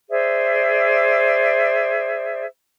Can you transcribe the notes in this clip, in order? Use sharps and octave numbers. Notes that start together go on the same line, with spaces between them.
G#4 C5 D5 E5